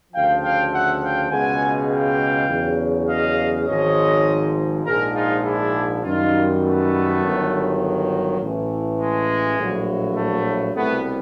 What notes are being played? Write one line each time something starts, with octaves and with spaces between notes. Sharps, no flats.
D2 C#3 F3 F5 G5
F5 G5
E5 F#5
F5 G5
C#2 B2 G#3 F#5 G#5
F5 G5
E2 C#3 F#3
D#5 F5
G#1 G#2 F3 C#5 D#5
A#1 G#2 F3 G#3 G#4 A#4
D#4 F4
D4 E4
F#2 D#3 G3 D#4 F4
A3 B3
G1 G2 D#3 F#3
A1 A2 E3
G#3
A#1 A2 F#3
A3
C2 B2 G3 A3 B3